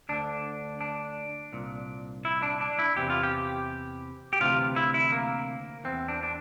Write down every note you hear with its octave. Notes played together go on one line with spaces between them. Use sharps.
D2 D3 D4
D4
C2 A#2
E4
D4
D4
E4
E2 C3 E3 G4
F4
G4
G4
D2 C3 E3 F4
E4
E4
A#3
E2 E3 C4
D4
D4